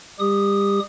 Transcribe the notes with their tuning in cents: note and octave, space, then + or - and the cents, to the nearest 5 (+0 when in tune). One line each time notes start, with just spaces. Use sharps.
G3 +35 G4 +25 D#6 +0